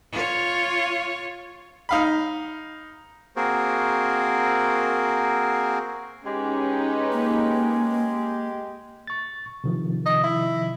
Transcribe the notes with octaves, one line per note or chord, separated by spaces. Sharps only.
F4 C#5
D#4 F5 B5
A#3 C4 F#4 G#4 A#4 C5
G#3 C#4 D#4 G4 B4
A#3
C#6 A6
C3 D#3 F3
D#5
E4